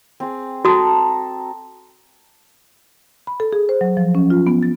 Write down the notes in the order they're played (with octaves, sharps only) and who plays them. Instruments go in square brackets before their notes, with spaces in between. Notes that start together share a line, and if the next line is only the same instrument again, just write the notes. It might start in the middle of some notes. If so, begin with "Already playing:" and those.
[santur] C4 G#4
[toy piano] F#4 D#6 [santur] A4 A#5
[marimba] B5
A4
G#4
C5
F#3
F3
C#4
F4
B3
A6